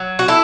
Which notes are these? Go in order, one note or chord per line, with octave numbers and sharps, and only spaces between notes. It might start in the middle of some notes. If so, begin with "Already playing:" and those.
Already playing: F#3
F#4
E4 A4